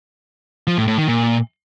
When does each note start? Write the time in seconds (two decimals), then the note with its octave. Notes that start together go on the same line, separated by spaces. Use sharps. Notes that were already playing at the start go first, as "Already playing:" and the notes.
0.67 F3
0.77 A2
0.88 A2
0.98 D#3
1.08 A#2